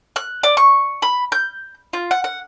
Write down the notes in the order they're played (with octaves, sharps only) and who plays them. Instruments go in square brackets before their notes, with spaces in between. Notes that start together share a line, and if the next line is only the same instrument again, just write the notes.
[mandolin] F#6
D5
C#6
B5
G6
F4
F#5
F#5